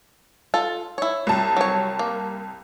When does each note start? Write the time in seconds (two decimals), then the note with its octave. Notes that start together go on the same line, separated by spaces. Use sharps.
0.54 F4 A4
0.98 E4 C#5
1.27 C2 A5
1.57 F#3 C#5
1.99 A#3